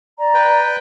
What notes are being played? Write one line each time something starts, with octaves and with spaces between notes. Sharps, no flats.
D5 A#5
B4 G5